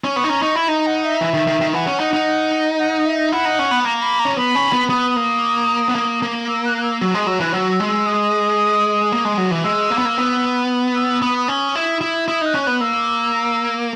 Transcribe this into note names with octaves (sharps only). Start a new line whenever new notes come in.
C#4
B3 C#6
D#4
C#4 A#5
D#4 C#6
E4 B5
D#4 A#5
F#5
E5
E3
D#3
D#3
D#3
E3 F#5
C#4
D#4
D#4
F#5
E5
E4 F#5
D#4
C#4
B3
A#3 A#5
B5
A#5
C#4
B3 B5
C#4
B3
B3 D#6
A#3
B3
A#3
A#3
E6
F#6
F#6
E6
F#3 E6
G#3 D#6
F#3 E6
E3 F#6
F#3 E6
E6
G#3
E6
D#6
A#3
G#3
F#3
E3
G#3 E6
A#3
B3
A#3
B3
E6
B3 D#6
C#4
E4
E4
E4 D#6
D#4 F#6
C#4
B3 F#6
A#3 E6